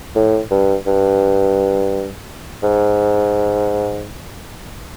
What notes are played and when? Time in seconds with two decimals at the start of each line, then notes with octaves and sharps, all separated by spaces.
0.15 A2
0.51 G2
0.87 G2
2.63 G#2